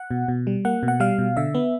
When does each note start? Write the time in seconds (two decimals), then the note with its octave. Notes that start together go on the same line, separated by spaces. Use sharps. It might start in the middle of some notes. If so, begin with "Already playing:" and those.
Already playing: F#5
0.11 B2
0.28 B2
0.47 G3
0.65 A#3 F#5
0.83 B2
0.88 F#5
1.00 G3 F5
1.19 B2
1.37 D3 E5
1.55 B3